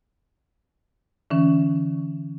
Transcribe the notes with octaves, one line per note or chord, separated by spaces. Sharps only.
D3 E3 C#4